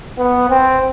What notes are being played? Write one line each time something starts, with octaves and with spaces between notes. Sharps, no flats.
B3
C4